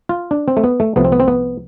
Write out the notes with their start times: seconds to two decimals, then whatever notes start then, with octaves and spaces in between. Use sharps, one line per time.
0.09 F4
0.31 D4
0.48 C4
0.57 A3
0.64 B3
0.80 A3
0.96 C2 C3 F3 A3 B3
1.05 C4
1.12 B3
1.20 C4
1.28 B3